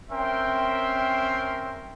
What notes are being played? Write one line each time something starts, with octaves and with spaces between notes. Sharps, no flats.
C4 C#4 A#4 E5 G5 C6